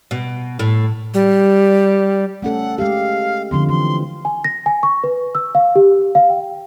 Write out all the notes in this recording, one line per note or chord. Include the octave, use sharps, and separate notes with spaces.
B2
A2
G3
A3 C#4 A4 F#5
G#3 G4 F5
D3 F3 C4 C6
E3 C6
G#5
A#6
G#5
C#6
B4
E6
F5
G4
F5
G5